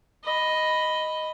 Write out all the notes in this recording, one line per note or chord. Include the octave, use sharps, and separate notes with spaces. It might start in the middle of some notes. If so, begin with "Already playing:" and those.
D#5 B5